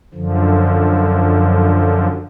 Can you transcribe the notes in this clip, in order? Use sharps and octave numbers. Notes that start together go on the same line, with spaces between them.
F#2 D3 F3